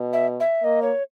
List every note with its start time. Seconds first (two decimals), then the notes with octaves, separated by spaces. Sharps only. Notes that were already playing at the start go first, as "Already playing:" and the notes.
Already playing: B2
0.13 E5
0.40 E5
0.63 A#3 D#5
0.82 C#5